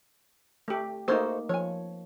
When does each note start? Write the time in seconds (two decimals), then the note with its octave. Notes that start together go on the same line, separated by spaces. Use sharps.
0.68 A3 G4
1.08 A3 A#3 D#4 F#4 A4 C5
1.49 F3 C#5 G#5